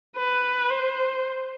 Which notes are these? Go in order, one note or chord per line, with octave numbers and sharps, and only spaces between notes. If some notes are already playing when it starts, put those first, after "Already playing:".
B4
C5